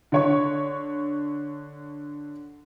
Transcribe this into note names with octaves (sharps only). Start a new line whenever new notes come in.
D3 C#5 C#6